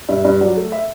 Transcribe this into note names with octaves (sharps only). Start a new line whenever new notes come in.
G2 E5
G2
F#3 D5
A3
E5